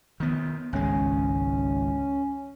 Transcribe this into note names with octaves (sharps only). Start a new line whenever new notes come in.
D#3 B3
G#1 C#2 G#3 C#4